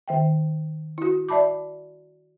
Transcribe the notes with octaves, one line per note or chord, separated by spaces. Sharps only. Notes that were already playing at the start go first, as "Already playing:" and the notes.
D#3 E5 G5
E4 F#4
D5 E5 A5 B5 D6